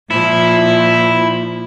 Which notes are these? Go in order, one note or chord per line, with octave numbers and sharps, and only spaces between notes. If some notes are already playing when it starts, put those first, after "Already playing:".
A#2 F3 E4